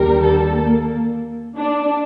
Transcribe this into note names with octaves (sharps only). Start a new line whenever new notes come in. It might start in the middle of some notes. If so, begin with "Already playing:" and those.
Already playing: D#2 D3 G3 A#4
A4
A#3
D4